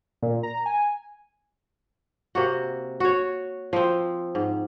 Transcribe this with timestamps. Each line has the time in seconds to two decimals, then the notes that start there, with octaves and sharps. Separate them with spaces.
0.22 A#2
0.43 A#5
0.66 G#5
2.35 C3 A#3 F#4
3.00 F#4 C#5
3.73 F3 C4
4.35 G#2